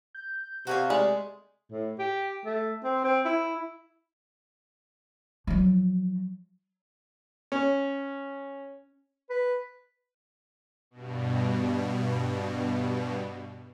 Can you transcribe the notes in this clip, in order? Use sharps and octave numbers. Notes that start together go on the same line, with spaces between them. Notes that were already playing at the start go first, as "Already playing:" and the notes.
G6
C3 F#4 G#4 F5
G#3 A3 D5
A2
G4
A3
C4
C4
E4
F3 F#3
C#4
B4
G2 B2